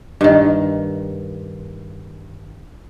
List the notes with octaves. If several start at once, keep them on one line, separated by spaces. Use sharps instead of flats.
G2 D#3